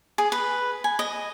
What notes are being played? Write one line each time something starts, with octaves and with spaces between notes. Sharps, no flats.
G#4
B4
G#5
D#5